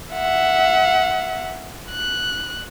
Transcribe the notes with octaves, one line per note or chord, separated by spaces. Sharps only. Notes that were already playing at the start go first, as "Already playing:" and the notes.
E5 F#5
F#6